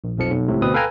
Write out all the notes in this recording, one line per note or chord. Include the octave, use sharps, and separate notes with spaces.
A#1
B1 F2 F3 C#7
B1
C#2 A2 C3
D2 B2 C4 B4 D#6
A4 B4 F5 G5 G#5 A#5